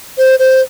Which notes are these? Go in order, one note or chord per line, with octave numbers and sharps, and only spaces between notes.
C5
C5